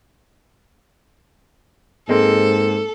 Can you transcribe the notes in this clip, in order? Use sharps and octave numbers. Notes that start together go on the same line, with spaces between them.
G#2 G#3 A#3 C4 A4